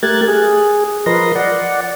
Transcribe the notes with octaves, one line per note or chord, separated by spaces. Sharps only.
A3 G4 A#4 F#6 G#6 A6
G#4
F3 A#4 B4 D#5 C6 A#6
D5 F#5